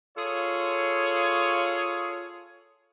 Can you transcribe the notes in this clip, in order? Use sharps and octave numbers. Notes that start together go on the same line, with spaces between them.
F4 G#4 A4 C#5